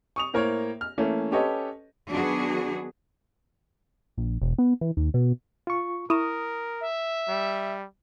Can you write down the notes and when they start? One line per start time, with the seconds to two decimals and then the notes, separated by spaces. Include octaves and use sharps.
0.16 C#6 D#6 F7
0.33 A2 A#3 A#4 C5 C#5
0.81 F6
0.98 E3 A3 A#3 C#4
1.32 C#4 G4 A4 B4 C#5 D#5
2.11 D#3 F#3 B3 D4 F#4 G#4
4.17 A#1
4.41 E1
4.58 B3
4.81 E3
4.97 D#2
5.14 B2
5.67 F4 C#6
6.10 E4 A#4 C#6 D#6 E7
6.81 E5
7.28 G3